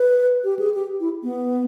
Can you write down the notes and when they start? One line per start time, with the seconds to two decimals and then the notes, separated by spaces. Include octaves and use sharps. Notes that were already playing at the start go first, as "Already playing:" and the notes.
Already playing: B4
0.44 G4
0.59 G#4
0.74 G4
1.00 E4
1.23 B3